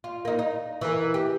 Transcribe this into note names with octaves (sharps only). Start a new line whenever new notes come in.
F4
A#3 D#4
D#4
E3 A#4
G4